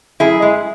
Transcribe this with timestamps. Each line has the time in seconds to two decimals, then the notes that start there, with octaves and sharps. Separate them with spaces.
0.20 F#2 E4 G#4
0.42 G#3